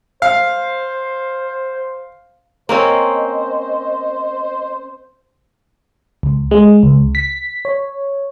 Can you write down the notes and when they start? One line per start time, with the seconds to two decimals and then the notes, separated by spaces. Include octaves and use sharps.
0.22 C5 F5
2.69 A#3 C4 C#4 C5 D#5
6.23 C#2
6.51 G#3
6.83 C#2
7.15 B6
7.65 C#5